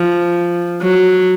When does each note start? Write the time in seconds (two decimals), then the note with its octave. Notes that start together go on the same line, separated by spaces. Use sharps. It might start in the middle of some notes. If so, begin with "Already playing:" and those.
Already playing: F3
0.82 F#3